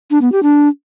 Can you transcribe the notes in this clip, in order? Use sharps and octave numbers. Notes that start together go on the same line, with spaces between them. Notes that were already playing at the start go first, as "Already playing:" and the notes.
D4
B3
G4
D4